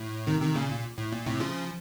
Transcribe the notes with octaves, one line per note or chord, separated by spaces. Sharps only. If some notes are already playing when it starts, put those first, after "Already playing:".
Already playing: A2
C3 D#3
C3 D#3
A#2 C#3
A#2
A2
A#2
A2 C3
C#3 F3